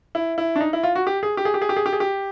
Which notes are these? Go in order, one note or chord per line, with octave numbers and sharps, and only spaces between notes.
E4
E4
D4
D#4
E4
F4
F#4
G4
G#4
G4
G#4
G4
G#4
G4
G#4
G4
G#4
G4